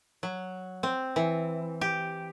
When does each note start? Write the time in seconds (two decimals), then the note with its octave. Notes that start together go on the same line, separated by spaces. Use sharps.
0.23 F#3
0.83 C4
1.16 E3
1.81 G4